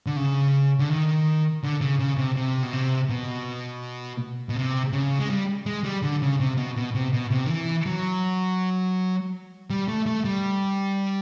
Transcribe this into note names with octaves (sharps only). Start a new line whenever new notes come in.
D3
C#3
D3
D#3
D3
C#3
C#3
C3
C3
B2
C3
B2
B2
C3
C#3
G#3
G3
G#3
G3
D3
C#3
C3
B2
B2
C3
B2
C3
D#3
E3
F#3
G3
A3
A3
G3